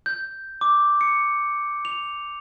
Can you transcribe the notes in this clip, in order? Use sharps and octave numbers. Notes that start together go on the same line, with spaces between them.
G6
D6
C#7
F7